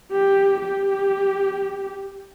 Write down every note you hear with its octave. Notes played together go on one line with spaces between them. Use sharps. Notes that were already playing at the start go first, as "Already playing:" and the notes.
G4
G4